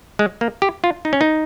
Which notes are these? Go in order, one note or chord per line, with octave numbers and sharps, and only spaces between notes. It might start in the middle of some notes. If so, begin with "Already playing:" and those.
G#3
A#3
G4
F4
D#4
C#4
D#4